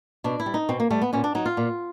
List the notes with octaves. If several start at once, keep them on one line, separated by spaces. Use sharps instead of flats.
B2 D4
E4
G3
D#4
B2 C4
A#3
G3 A3
B3
A#2 C#4
D4
F#3 D#4
F4
A#2